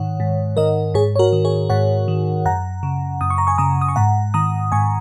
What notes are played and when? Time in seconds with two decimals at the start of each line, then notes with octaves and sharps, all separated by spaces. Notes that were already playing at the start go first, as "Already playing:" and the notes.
Already playing: G#2 D#3 C#5 F#5
0.20 G#2
0.57 D#3 A#4 D#5
0.94 G#2 G#4 C#5
1.16 C#5
1.19 F#4 A#4
1.33 D#3
1.45 G#4 C#5
1.70 G#2 C#5 F#5
2.08 D#3
2.46 F#2 F#5 A#5
2.83 C#3
3.21 F#2 D#6
3.30 C#6
3.38 A#5
3.47 G#5 C#6
3.58 C#3 A#5 D#6
3.81 D#6
3.88 C#6
3.96 G#2 F#5 A#5
4.34 D#3 A#5 D#6
4.72 G#2 G#5 C#6